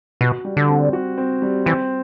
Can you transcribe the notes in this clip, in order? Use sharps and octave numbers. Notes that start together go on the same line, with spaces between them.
B2 F#4
G3
D3
C4
F#4
C4
G3
E3 C4